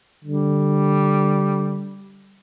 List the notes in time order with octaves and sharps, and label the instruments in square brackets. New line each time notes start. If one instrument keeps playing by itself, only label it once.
[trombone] D3 [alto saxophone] G3